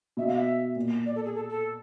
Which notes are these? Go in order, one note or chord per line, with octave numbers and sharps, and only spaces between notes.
B2 E5
F5
E5
A#2
D5
A4
G#4
A4
A4